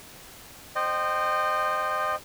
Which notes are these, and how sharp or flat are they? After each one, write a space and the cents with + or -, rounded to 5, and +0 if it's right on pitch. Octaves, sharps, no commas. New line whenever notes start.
C5 +0 D#5 -25 G5 -15